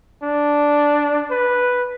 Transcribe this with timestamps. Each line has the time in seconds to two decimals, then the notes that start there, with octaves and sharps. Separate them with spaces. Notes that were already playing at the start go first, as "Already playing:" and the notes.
0.23 D4
1.31 B4